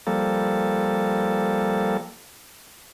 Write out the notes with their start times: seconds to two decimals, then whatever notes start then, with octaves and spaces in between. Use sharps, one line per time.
0.07 F3 G3 A#3 A4